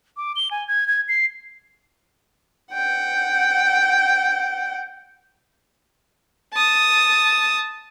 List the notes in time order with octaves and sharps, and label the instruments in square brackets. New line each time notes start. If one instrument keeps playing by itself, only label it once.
[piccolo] D6
G7
G#5
G#6
G#6
C7
[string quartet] F#5 G5
[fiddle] A5 D#6